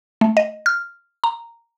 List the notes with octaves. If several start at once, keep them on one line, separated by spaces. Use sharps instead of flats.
A3
D#5
F6
A#5